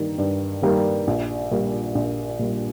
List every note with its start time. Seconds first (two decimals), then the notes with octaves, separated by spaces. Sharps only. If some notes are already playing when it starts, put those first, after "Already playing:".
Already playing: G2 D#3 G3 A#3
0.18 G2
0.62 D#3 G3 A#3
1.07 A#1
1.51 A#2 G3
1.95 A#1
2.39 A#2 G3